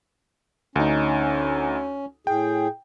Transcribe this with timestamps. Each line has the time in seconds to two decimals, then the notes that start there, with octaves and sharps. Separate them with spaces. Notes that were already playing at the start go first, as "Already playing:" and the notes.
0.76 D2 C#4 D#4
2.27 A2 G#4 G5